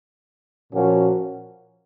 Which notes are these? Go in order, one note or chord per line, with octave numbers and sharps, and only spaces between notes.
A#2 F3 A#3 C#4 F#4